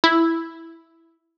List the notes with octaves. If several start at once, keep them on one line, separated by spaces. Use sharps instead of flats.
E4